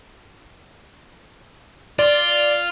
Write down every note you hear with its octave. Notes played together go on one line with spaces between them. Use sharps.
F4 D5